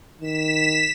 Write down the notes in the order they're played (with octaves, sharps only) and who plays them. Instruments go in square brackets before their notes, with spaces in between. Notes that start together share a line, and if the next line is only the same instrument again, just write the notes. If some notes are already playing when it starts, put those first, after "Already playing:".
[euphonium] D#3 [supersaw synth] B6 E7